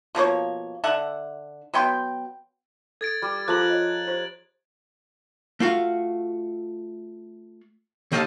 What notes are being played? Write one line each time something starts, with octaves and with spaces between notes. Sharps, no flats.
B2 F3 A#3 C#5
D3 E5 F#5
F#3 B3 G5 C6
A4 G#6 A6 D7
G3
F3 G#4 A4 F5 A#5 F#6 F#7
C#5 D#5
F4 G4 C5
A3 F4 F#4 F5
D#2 D#3 A4 D#5 F5 A5